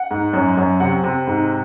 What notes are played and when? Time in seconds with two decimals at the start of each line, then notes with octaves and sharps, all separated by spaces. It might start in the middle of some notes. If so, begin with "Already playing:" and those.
Already playing: F#5
0.11 G#2
0.33 F#2
0.57 F#2
0.80 C3 F#5
1.04 C3
1.27 G#2